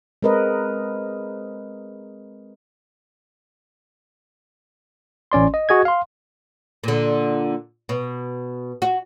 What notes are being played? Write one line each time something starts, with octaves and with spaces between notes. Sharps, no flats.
G#3 C4 A#4 B4 D#5
A1 C#4 D5 C6
D#5
F#4 G#4 D#5 G#6
F5 C6
A#2 D3
B2
F#4